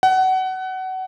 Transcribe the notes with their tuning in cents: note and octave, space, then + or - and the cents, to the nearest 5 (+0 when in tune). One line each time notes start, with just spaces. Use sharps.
F#5 +25